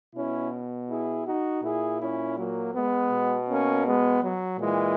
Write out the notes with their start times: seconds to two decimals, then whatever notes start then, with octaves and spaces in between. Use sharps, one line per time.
0.15 B2 C#4 E4
0.89 E4 G#4
1.27 D#4 F#4
1.64 A#2 E4 G#4
2.01 C#4 E4
2.38 F#3 A#3
2.75 G#3 B3
3.11 B2
3.49 A#3 C#4
3.86 G#3 B3
4.22 F#3
4.59 A#2 E3 G#3